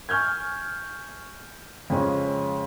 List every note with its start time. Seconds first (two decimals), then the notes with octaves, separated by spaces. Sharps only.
0.09 G#5 C#6 F6 G6 G#6
1.90 F2 C#3 G#3 C#4